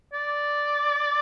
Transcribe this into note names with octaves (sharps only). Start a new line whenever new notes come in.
D5